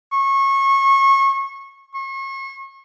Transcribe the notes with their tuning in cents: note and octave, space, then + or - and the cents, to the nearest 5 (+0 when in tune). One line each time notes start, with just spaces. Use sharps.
C#6 -25
C#6 -40